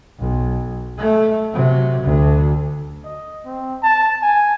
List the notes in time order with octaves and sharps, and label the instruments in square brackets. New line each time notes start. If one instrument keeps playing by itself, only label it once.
[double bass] B1
A3
C3 F#3
D2
[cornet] D#5
C4
A5
G#5